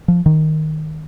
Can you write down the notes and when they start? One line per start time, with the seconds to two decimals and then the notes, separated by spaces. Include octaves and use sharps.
0.08 F3
0.26 D#3